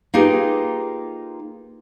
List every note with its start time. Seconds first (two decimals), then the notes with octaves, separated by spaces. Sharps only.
0.14 A#3 D#4 F4 G4 G#4 B4